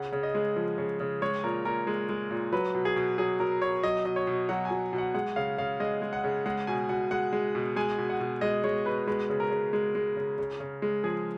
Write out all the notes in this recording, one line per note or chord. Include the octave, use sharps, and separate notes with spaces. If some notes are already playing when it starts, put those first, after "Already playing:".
Already playing: C#3 F#5
C#3
D#5
G#3
F3
C#3
C#3
G#3 C#5
A#2 A#4
A#2 A#4
G#3
G#3
A#2
F#3 B4
B2
G#4
B2
F#3 G#4
F#3 A#4
B2 C#5
F#3 D#5
B2 D#5
C#5
B2
F#3 F#5
G#5
F#3
B2
F#5
G#3 F#5
C#3 F5
C#3 F5
G#3 D#5
G#3
F#5
C#3
G#3 F#5
B2 G#5
B2 F#5
G#3 F#5
G#3
B2
G#3 G#5
B2
F#5
B2
G#3 D#5
G#3 C#5
B2 B4
G#3 B4
C#3
A#4
C#3
G#3
G#3
C#3
C#3
C#3
G#3
F3 G#4